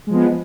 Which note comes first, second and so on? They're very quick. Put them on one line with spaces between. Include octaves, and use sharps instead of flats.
G#3 F3 B3